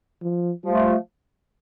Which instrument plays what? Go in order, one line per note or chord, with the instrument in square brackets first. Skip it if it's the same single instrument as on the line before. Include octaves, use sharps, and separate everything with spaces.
[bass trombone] F3
[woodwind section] F3 A3 F4 [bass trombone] G3